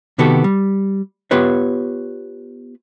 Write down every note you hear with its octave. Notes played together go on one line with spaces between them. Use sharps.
C3 D#3 B3 F#4 G4 A4
G3
B3 F4 G4 B4 C#5